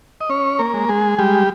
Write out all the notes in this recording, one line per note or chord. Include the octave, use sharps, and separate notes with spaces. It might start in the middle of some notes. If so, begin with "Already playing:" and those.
D#5
C#4 C#5
A#3 A#4
G#3
G#3 G#4
G3 G#3 G4